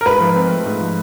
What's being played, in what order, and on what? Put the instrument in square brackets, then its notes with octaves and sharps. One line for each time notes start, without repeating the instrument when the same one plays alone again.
[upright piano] A#4
[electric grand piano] G#2 [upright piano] B4
[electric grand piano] F3
C4
A3
G#2
F3